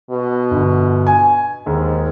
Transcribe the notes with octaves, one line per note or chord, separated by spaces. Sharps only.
B2
G1
G#5
D#2 G#2